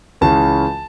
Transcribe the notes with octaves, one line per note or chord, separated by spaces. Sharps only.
C#2 C#3 E3 A5